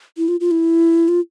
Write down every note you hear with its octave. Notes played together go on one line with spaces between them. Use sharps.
E4
F4
F4
E4
F4